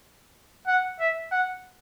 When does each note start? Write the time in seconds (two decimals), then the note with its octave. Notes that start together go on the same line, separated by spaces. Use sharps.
0.67 F#5
1.00 E5
1.31 F#5